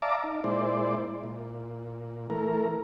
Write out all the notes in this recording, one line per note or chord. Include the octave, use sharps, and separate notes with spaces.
D5 E5 F5 A5 A#5 D6
D#4
A#2 G#3 E4 C5 D5
A#2
E3 A3 A#4